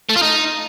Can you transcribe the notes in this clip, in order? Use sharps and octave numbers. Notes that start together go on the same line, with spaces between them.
A3
F4
D#4